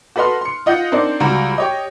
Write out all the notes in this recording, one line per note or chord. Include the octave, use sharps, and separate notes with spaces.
F#4 A4 B4 D#5 C6 F6
C6 C#7
F4 D#5 F#5 G6 C#7
C4 D4 D#4 A#4 C5 D5
C#2 G3 F#4 A#5
G4 C#5 D#5